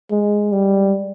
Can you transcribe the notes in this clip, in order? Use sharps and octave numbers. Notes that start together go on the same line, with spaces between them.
G#3
G3